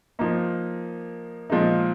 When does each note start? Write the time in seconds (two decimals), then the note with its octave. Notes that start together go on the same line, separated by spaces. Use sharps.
0.19 F3 A#3 D#4
1.50 A#2 F3 G#3 D#4